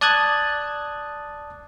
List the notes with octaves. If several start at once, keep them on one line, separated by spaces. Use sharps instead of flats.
D5 A5 D#6 F#6 G#6